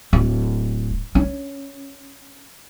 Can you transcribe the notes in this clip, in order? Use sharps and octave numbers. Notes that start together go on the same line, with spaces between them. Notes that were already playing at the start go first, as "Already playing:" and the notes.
D1
C#4